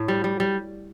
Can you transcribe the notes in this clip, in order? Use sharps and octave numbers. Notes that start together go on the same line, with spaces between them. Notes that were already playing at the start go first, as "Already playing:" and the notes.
Already playing: A2
G3
G3
G3